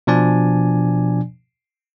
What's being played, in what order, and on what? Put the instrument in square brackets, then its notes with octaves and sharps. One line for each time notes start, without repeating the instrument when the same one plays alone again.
[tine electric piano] B2 F3 D4 D5 G#5